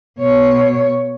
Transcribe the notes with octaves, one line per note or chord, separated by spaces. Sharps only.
B2 C#5